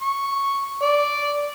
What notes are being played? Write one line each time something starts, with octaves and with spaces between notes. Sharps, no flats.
C#6
D5